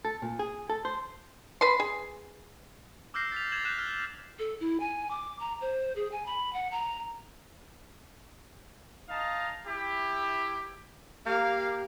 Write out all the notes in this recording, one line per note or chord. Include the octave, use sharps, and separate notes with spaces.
A4
A#2
G#4
A4
C5
B4 B5 C6
G#4
D6 E6 F6 G6 A#6 C7
A6 B6 F7
G#6 A6 E7 F#7
F#6 G6 E7
F6
A4
E4
G#5
D6
A#5
C5
G#4
G#5
B5
F#5
A#5
D#4 D#5 F5 A5 A#5
E4 G4
A#3 G4 F5